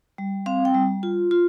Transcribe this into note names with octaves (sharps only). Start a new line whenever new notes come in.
G3
C4 F5
G5
G3
F4
F4